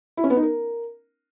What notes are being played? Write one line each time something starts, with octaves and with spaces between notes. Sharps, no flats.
E4
C#4
B3
D#4
A#4